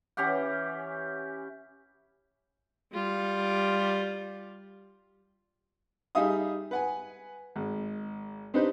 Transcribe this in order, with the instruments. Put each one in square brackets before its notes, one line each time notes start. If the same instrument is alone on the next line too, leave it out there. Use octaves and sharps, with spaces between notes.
[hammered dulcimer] E3 C#4 G4 F#5
[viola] G3 F4
[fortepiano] G3 D#4 G#4 E5 F5 D#6
B4 F#5 G#5
G#1
C4 D4 D#4 G4 B4 C5